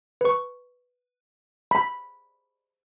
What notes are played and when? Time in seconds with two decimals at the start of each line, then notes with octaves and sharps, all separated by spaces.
0.21 B4 C#6
1.71 B5